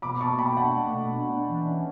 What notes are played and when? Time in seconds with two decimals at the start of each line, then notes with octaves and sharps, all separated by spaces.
0.02 B2 B5 D6
0.21 B2 A5 C#6
0.39 B2 G5 B5
0.57 D4 F#5 A5
0.75 A3
0.94 B2
1.11 D4
1.29 D4
1.48 E3
1.66 C#4